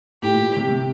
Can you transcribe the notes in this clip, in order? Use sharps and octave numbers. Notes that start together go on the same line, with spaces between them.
A2 G4
A#2
C3
C3